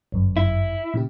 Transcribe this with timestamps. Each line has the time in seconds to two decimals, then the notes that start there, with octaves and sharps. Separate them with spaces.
0.12 G1 F#2
0.37 E4
0.94 A#2 C#3 G4